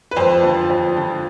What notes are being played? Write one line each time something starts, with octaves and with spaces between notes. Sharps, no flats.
B4
F2 C5
D3 F3
F2
D3 F3